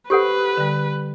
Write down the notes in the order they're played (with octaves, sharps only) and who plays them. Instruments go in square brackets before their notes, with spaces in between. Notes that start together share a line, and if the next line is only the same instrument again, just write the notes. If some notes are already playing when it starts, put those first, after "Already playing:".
[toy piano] G4 A4 F#5 [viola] B4 [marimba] C5 G6
[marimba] D3 G3